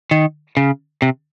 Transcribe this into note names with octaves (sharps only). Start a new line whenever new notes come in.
D#3
C#3
C3